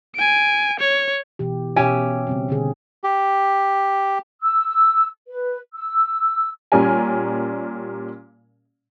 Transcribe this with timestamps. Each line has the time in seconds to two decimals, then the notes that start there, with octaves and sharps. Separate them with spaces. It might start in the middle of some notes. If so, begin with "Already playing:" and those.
0.15 G#5 D7
0.79 C#5
1.39 B2 E3 G4
1.76 B2 C#4 G4 E5 G#5
2.27 C#3 G3 C4
2.49 B2 D3 G#4
3.04 G4
4.42 E6
5.30 B4
5.74 E6
6.72 A#2 G3 C#4 A#4 G#5